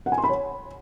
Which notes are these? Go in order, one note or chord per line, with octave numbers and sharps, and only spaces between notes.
F#5
G#5
C6
B5
C#5